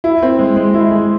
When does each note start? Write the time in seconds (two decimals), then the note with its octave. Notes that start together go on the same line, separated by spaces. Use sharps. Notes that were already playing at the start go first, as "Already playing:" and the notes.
0.04 E4
0.23 C4
0.39 G#3
0.56 G#3
0.74 E4
0.91 G#3